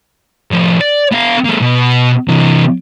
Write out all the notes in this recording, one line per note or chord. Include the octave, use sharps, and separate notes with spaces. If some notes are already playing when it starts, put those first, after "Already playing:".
A2 F3
D5
B3 F5
G#3 A#3
B2
C3 E3